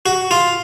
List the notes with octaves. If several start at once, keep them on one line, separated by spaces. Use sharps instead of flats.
F#4
F4